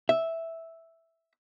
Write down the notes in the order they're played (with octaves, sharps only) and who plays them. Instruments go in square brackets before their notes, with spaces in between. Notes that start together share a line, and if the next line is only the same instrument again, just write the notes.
[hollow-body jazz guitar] E5